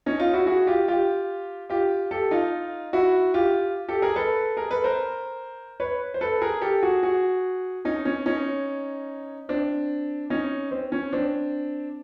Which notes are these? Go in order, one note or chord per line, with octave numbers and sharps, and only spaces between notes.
C#4 D#4
D#4 F4
E4 F#4
F#4 G#4
F4 G4
F4 G4
F4 G4
G4 A4
D#4 F4
E4 F#4
F4 G4
G4 A4
G#4 A#4
A4 B4
G#4 A#4
A4 B4
A#4 C5
B4 C#5
C5
A4 B4
G#4 A#4
G4 A4
F#4 G#4
F#4 G#4
C#4 D#4
C#4
C#4 D#4
C4 D4
C#4 D#4
C4
C#4
C4 D4